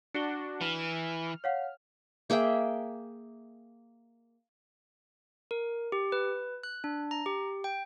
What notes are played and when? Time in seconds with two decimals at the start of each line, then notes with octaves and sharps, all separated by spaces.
0.14 D4 F#4 C#7 G7
0.61 E3 F6
1.44 C#5 F5 F#5
2.30 A#3 G#4 E5 G5
5.51 A#4
5.92 G4
6.12 B4
6.63 F#6
6.84 D4
7.11 A#5
7.26 G4
7.64 G5